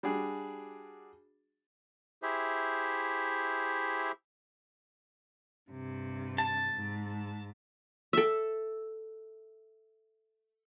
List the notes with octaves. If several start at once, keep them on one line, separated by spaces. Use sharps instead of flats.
G3 D4 F#4 G#4
E4 G4 G#4 C5 E5
G2 C3
A5
G#2
A4 E5